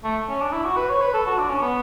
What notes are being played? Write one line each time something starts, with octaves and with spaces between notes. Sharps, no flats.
A3
C#4
D4
E4
F#4
B4
C#5
B4
A4
F#4
D4
C#4
B3